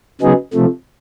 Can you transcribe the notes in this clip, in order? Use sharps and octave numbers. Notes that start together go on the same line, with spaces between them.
C#3 F#3 B3 D#4 G#4
C3 F3 A3